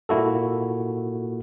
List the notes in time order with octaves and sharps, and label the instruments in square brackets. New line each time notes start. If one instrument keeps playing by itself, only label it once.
[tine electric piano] A#2 A#3 E4 F#4 A4